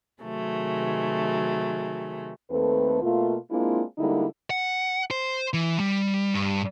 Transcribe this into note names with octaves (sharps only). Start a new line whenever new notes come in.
C3 D#3 F#3 G#3 A3
D#2 A3 C4 A4 B4
B2 A3 A#3 F4
G#3 A#3 C4 D4 E4 F4
D3 G3 G#3 A#3 D#4 E4
F#5
C5
E3
G3
G2